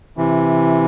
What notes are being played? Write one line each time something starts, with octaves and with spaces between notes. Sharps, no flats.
C3 E3